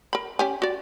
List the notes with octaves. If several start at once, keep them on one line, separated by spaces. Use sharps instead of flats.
A#4 B5
C#4 G4 G#5
F#4 D5